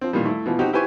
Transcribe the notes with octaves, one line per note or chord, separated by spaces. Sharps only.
F3 C4
A#2 D#3 E3 G3
A3 E4
B2 E3 F3
C4 D#4 F#4 G4
E4 G4 B4 C5 G#5 C#6